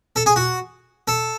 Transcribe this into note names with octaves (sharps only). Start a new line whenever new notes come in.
A4
G#4
F#4
A4